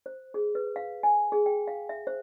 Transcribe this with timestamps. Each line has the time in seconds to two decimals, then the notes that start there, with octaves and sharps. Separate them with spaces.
0.06 C5
0.34 G#4
0.55 B4
0.76 F5
1.03 G#5
1.32 G#4
1.46 G5
1.68 F5
1.89 E5
2.07 C5